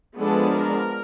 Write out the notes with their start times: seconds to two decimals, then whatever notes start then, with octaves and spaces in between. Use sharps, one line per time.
0.17 F3 G#3 B3 D4 A4
0.51 A#4